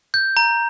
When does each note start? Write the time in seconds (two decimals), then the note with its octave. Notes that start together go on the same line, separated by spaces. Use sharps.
0.14 G6
0.37 A#5